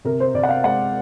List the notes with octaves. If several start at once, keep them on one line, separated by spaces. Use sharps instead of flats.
C3 A#4
C5
C3 D5
F#5
F5
G#3 F#5